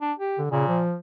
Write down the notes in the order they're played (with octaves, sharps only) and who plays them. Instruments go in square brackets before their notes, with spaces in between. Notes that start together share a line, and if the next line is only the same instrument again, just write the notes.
[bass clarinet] D4
G4
[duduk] D3
[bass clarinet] A#2 [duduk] C#3
[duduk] F3